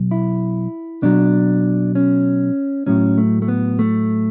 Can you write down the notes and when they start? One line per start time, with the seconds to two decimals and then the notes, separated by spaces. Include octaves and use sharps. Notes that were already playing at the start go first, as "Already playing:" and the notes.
Already playing: B2 F#3
0.11 E4
1.03 B2 F#3 D4
1.95 C#4
2.86 A2 F#3 C#4
3.18 A3
3.42 A3
3.48 B3
3.79 A3